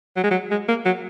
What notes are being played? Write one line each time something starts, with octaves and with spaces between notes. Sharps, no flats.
F#3
G#3
F#3
G#3
A#3
F#3